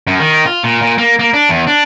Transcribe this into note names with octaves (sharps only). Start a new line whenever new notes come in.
F#2
D#3
F4
A#2
A#2
A#3
A#3
D4
E2
D4